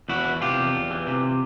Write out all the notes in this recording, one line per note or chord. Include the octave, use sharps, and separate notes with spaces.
E2 E4 F#4
E3
C3 F4 G4
E2
E2
E3
C3